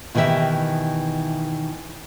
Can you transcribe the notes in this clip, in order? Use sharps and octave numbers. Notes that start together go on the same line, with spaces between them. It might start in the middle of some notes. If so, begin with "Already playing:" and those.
B2 D#3 E3 G4 E5